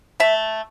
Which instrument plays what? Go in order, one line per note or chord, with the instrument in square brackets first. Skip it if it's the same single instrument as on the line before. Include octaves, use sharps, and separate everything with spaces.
[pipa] A3 E5